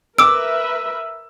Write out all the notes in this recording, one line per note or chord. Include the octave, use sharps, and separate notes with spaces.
A#4 B4 E5 D6 E6 D7